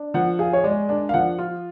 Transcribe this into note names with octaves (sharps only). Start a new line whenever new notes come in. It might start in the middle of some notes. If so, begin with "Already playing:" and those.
Already playing: D4
F3 F#5
G#4 F5
C#5
G#3 D5
D4 D5
F5
F3 F#5
F4